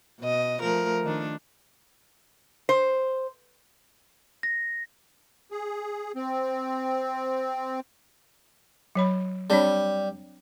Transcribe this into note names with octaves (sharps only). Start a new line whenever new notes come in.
B2 D#5
F3 A3 A#4
D#3 D4
C5
A#6
G#4
C4
F#3 C#5 B5
G3 C4 D4 C#5